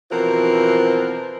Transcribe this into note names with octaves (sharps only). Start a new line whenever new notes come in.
B2 E3 F3 C4 A#4